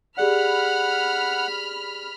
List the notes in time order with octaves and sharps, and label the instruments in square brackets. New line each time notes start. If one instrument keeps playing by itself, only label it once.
[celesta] G4 G#4 D5 [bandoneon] F#5 [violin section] B5 F6